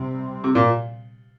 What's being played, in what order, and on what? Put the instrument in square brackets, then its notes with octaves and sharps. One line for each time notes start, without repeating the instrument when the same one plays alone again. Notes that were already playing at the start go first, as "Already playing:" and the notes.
Already playing: [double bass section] C3 G3 C4
[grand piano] C3
A#2